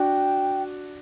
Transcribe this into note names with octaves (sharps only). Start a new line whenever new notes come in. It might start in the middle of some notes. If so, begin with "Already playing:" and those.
Already playing: D4 F#4 G5